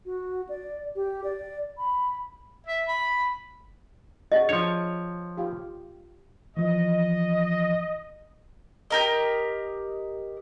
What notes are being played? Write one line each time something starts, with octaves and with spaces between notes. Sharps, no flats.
F#4
D5
G4
D5
B5
E5
B5
F#4 G#4 D#5
F3 D4 C#5
F4 G4
E3 F3 D#5
G4 A#4 D#5